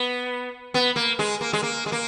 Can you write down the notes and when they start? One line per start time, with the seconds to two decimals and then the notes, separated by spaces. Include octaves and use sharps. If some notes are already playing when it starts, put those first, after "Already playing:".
Already playing: B3
0.74 B3
0.96 A#3
1.19 G#3
1.41 A#3
1.53 G#3
1.63 A#3
1.86 G#3
1.92 A#3